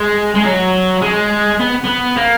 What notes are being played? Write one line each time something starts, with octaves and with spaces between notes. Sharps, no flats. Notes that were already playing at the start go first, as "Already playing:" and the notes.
Already playing: G#3
G#3
F#3
G#3
B3
B3
A#3